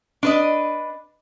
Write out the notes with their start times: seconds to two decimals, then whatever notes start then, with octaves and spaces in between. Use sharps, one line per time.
0.23 D4 B4 D#5